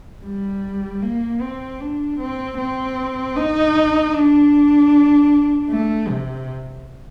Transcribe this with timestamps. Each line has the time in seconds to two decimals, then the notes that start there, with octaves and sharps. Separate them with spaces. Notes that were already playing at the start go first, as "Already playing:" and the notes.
0.25 G3
1.03 A#3
1.42 C4
1.81 D4
2.19 C4
2.58 C4
3.37 D#4
4.14 D4
5.69 A3
6.08 C3